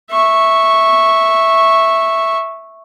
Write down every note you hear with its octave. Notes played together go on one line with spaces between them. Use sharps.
E5 C#6